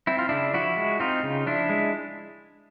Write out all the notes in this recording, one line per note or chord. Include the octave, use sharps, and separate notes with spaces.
C4 E4
F4
C#3 D4 E4
F3 E4 F#4
G#3
C4 D#4 F4
C#3
F3 D4 E4
G#3